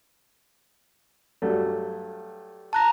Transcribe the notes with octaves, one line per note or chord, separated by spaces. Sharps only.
G2 F#3 A3
A5 A#5 F#6 A#6